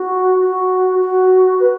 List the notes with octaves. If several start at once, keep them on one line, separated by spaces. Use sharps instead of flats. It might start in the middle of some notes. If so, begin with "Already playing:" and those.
Already playing: F#4
F#4
F#4
B4